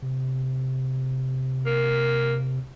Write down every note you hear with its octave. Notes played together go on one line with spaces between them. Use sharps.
C3
A#3